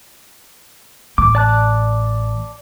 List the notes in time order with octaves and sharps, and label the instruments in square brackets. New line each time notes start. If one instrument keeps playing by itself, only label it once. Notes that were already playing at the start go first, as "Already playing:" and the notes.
[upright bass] A1 [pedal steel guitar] D6
[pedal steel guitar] D5 A5 F#6